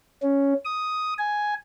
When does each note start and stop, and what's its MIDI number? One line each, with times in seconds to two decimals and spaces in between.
0.22 0.54 61
0.65 1.14 87
1.18 1.54 80